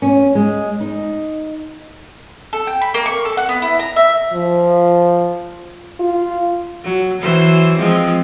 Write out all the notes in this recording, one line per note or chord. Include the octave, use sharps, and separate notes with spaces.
C#4
G#3
D#4
A4
G5
B5
A#3
C#6
A4
F#5
B3
E4
A#5
E5
F3
F4
F#3
E3 F#3 C5
F3 G#3 C4